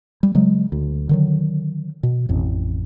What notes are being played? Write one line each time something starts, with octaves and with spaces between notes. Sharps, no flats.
G3
C#3 F#3 G#3
D2
D3 D#3 F#3
B2
A1 F2